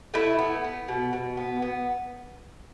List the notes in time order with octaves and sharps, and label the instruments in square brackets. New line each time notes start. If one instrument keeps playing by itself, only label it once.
[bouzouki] A3 E4
B3
B3
B2
B2
B3
B3